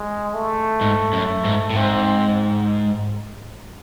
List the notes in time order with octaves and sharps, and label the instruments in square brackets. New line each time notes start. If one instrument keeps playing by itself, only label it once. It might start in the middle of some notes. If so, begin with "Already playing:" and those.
Already playing: [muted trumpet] G#3
A3
[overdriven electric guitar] G#2
F#2
G#2
A2
[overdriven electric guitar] G#2 [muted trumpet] C4